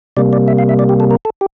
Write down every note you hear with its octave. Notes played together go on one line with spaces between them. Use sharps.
C3 G3 A#3 D5
D5
E5
F5
E5
D5
G4
A4
A#4
A4
G4